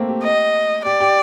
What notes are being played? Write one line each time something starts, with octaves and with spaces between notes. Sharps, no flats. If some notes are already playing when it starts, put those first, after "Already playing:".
Already playing: A3 A#3 C4
G4
D#5
G4 D5
G4